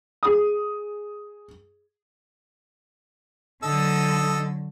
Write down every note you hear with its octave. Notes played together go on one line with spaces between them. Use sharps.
G#4 D#6
D3 F#3 A4 D#5 E6